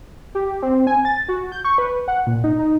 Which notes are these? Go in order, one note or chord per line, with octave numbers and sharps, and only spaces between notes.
G4
C4
G#5
A6
F#4
G6
C#6
B4
F#5
A#2
D#4
D#4